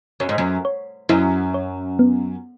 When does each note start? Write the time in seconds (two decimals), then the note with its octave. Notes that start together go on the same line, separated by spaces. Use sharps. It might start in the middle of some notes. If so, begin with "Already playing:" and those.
0.20 F#2 C#5
0.29 G#2
0.38 F#2
0.65 C#5
1.09 F#2 E4
1.54 C#5
1.99 B3